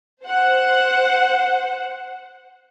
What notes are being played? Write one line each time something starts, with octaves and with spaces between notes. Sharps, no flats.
C5 F#5